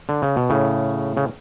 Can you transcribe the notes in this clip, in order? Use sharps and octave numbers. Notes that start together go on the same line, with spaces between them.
D3
C#3
B2
A2 C#3
C#3